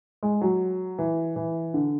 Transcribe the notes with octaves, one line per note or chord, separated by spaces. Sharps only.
G#3
F#3
E3
E3
D3